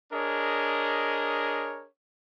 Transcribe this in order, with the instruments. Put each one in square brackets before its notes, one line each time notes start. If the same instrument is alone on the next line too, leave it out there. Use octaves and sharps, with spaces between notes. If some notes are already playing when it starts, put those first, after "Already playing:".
[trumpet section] D4 G#4 A#4 C#5 D#5